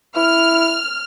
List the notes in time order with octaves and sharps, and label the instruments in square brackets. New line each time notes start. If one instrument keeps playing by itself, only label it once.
[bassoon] E4 [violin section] F6